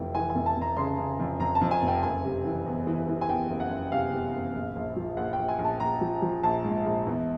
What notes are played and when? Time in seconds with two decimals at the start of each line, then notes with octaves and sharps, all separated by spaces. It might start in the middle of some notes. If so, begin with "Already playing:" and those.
Already playing: F1 F2 E3 G5
0.15 E3 G#5
0.30 G#5
0.35 F1
0.46 A5
0.56 F1
0.61 A#5
0.77 C#3 C6
0.98 C#3
1.19 F2
1.40 F2 A#5
1.55 A5
1.61 F2
1.71 G#5
1.82 F1
1.88 G5
2.03 F#1 G#5
2.25 C3
2.45 E3
2.66 E2
2.87 E3
3.08 E3
3.21 G#5
3.29 E2 G5
3.49 F#1
3.60 F#5
3.70 F#1
3.92 C3 F5
4.13 C3
4.33 F#1
4.54 A#1
4.76 A#1
4.96 F3
5.17 A#1 F#5
5.33 G5
5.39 A#1
5.48 G#5
5.59 A#1
5.64 A5
5.80 A#1 A#5
6.01 F3
6.22 F3
6.43 A#1 A5
6.65 G#2
6.86 A#1
7.07 E2